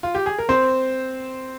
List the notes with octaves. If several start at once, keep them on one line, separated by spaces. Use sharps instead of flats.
F4
G4
G#4
A#4
C4 C5